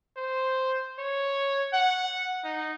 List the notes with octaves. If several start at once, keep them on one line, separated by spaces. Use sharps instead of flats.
C5
C#5
F#5
D#4